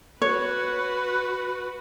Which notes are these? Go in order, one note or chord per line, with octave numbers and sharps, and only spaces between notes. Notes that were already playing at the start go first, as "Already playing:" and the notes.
F#4 B4 C#5